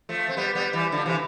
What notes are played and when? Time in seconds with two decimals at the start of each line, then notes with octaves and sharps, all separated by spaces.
0.09 F3 A3
0.29 C4
0.37 G3 B3
0.55 G3 B3
0.73 E3 G3
0.92 D3 F3
1.06 C3 E3